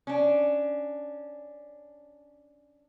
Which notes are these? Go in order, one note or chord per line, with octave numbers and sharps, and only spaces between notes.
C#4 D4